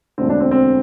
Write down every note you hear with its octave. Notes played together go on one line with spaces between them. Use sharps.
E1 D2 D3 C4
D4
C4
C4